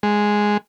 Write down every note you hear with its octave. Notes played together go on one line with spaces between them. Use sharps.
G#3